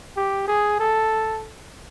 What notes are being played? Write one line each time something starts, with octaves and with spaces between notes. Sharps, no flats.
G4
G#4
A4